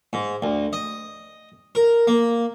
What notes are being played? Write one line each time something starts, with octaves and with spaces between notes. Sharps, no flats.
G#2
D2
D#5
A#4
A#3